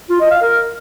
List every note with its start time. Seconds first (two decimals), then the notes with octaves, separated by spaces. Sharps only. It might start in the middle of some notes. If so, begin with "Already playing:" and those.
0.10 F4
0.20 D#5
0.31 F5
0.41 A#4